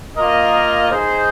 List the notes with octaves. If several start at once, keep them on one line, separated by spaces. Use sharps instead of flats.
A#3 F4 A#4 D#5
D#4 G#4 C5